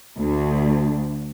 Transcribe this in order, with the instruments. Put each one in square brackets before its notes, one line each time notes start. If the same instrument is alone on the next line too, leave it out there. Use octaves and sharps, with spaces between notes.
[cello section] D2